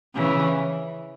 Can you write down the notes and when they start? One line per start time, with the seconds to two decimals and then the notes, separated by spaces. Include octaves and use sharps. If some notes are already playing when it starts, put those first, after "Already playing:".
0.14 C#3 E3